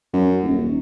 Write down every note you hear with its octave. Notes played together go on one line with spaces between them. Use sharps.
F#2
D#1